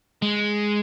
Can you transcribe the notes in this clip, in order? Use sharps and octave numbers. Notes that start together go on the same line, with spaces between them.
G#3